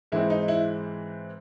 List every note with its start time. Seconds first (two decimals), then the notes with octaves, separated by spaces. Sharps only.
0.12 G#2 E3 G#3 C4 D#4 E4
0.30 D#4
0.48 E4